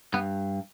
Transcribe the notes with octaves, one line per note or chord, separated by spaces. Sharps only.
G2 B3